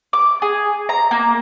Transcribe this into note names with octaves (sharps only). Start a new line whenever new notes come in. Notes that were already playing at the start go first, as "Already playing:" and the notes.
D6
G#4
A#5
A#3